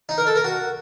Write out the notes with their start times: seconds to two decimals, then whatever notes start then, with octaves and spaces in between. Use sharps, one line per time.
0.09 D#4
0.18 A#4
0.27 A4
0.36 A#4
0.44 F#4